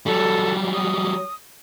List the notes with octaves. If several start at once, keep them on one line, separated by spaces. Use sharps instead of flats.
F#3 G3 A4
D#6